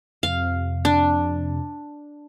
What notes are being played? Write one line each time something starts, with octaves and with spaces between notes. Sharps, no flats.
F2 C3 F5
D4